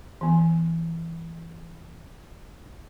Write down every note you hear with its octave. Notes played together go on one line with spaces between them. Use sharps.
E3 B3